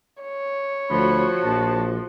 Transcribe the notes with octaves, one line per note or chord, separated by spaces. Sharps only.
C#5
D2 F3 F#4 B5
A#1 A5